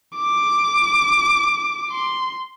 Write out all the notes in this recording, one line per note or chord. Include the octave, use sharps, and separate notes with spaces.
D6
C6